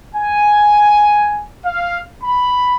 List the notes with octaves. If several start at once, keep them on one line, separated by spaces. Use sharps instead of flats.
G#5
F5
B5